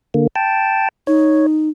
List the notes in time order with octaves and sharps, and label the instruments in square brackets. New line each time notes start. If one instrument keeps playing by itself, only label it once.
[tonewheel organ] D3 A#3
G5 A5
[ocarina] D#4 [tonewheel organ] C#5